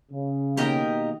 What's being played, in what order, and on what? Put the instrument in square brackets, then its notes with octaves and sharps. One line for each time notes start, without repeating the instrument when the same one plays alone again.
[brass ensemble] C#3
[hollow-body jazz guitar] B2 D#3 A#3 [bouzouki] G4 A#4 D#5